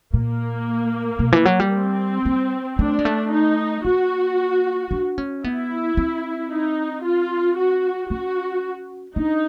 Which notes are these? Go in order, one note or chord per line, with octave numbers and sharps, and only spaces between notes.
A#2 A#3
B2
E3
F#3
G3
C4
G3
A3 D4
G#3
A3
D#4
A#3 F#4
D4
C#4
B3 E4
C4
D#4
F4
F#4
C#4 F#4
D4 D#4